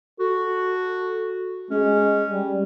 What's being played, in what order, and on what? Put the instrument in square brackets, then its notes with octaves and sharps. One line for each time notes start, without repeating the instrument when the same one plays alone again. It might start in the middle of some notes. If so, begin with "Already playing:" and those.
[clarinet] F#4 [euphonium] A4
[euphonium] G#3 [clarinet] C#4
[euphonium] G3